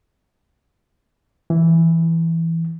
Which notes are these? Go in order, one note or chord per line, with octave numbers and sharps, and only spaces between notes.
E3